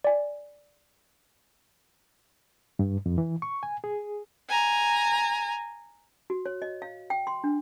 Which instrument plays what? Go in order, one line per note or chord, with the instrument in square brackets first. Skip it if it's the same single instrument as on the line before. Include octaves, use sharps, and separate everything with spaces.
[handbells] D5 G#5
[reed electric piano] G2
F2
E3
C#6
G#5
G#4
[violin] G#5 A#5
[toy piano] F#4
C#5
D#5
F5
G5
C6
D4